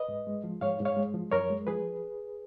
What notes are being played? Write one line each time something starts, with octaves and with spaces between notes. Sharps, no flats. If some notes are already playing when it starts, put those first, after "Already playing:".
Already playing: B4 D#5
G#2
G#3
F3
G#2 C#5 F5
G#2
C#5 F5
G#3
F3
F#2 A#4 C#5
G#3
F3 G#4 B4